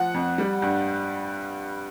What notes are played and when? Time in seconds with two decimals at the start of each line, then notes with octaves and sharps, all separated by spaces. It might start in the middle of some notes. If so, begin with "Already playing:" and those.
Already playing: F3 F#5
0.14 F2
0.38 G3
0.62 G2